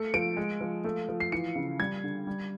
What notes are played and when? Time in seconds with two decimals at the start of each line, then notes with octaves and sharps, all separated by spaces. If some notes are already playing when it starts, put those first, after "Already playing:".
Already playing: A3 C#7
0.14 F3 D7
0.37 G#3
0.61 F3
0.84 A3
1.09 F3
1.20 C7
1.32 E3 C#7
1.56 C#3
1.80 G3 G#6
2.04 D3
2.27 G3